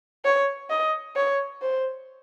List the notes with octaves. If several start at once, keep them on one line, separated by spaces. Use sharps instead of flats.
C#5
D#5
C#5
C5